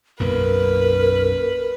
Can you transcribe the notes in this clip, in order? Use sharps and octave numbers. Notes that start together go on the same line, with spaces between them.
B1 F#2 A#3 A#4 B4